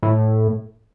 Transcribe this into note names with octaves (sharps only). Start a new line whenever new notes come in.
A2